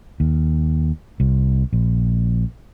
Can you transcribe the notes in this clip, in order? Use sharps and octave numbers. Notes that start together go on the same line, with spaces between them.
D#2
C2
A#1